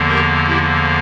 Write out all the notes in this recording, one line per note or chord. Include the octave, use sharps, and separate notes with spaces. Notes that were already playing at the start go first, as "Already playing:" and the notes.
Already playing: E2 D3 F3 A#3
G4 A#4
E4 G4